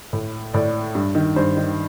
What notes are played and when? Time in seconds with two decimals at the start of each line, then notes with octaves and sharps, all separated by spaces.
0.13 A2
0.54 A2 D5
0.95 G2
1.15 D#3
1.36 G2 C5
1.57 D#3